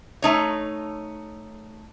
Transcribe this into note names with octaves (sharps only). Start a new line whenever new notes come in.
A3 D#4 C#5